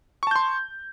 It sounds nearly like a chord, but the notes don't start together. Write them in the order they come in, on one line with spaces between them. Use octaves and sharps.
C#6 A5 G6 C6